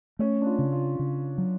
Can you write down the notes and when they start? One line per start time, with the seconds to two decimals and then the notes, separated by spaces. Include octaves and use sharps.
0.19 A3 C#4
0.42 D4
0.46 F4
0.59 C#3
0.72 F4
0.99 C#3
1.38 F#3